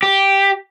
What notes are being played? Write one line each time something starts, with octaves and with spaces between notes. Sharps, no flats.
G4